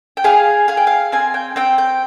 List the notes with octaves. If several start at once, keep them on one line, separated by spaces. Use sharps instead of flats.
G5
G#4 F5
G#4 F5
G5
F5
C4 G#5
G5
C4 G5
G5